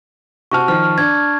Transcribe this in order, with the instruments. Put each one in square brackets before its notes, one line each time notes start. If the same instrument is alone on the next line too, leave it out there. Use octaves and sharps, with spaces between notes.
[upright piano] C3 F#4 F6 [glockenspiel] A5 C#6
[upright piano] D#3 F3 [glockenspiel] F6
[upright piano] D4 [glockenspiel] G#6